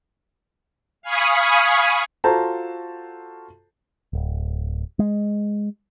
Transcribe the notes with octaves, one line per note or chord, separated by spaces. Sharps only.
F5 G#5 B5 C#6 D#6
F4 F#4 A4 C5 A5 A#5
D1
G#3